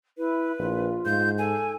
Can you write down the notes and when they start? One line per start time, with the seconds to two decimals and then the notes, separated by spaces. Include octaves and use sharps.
0.18 E4 B4
0.59 A#1 F4
1.06 G#2 G6
1.38 A4 G#5